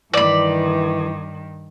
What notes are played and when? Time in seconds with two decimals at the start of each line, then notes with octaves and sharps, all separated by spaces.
0.14 G2 D#3 E3 D5 B5